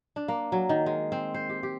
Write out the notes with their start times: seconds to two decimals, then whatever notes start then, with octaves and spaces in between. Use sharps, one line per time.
0.16 D4
0.28 A#3
0.52 F#3
0.69 D#3
0.86 G#3
1.12 C4
1.34 C5
1.49 G4
1.63 G4